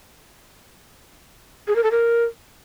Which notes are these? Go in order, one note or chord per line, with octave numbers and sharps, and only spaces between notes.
G#4
A#4
A4
A#4